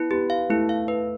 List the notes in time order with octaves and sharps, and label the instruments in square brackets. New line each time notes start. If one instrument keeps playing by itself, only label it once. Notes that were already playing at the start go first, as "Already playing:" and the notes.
Already playing: [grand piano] B3 [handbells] E4
[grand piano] B3 [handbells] G4
[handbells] F5
[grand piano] A3 [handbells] E4
[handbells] F5
B4